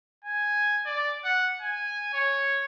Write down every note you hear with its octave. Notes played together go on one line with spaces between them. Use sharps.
G#5
D5
F#5
G#5
C#5